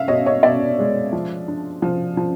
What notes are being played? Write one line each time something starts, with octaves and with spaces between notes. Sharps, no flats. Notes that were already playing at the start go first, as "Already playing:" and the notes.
Already playing: C#4 E5 F5
B2 C#5 D#5
C#5 D#5
B2 D5 E5
G#3
F3
D4
F3
F3